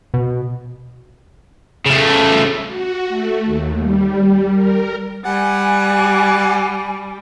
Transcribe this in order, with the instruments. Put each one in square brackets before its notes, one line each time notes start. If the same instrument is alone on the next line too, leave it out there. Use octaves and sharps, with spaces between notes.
[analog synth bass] B2
[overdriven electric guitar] C#3 A3
[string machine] F#4
A3
D#2
G3
A#4
[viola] G3 [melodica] F#5 [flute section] G#5